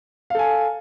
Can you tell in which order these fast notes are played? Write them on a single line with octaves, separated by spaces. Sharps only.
F5 A4 G#5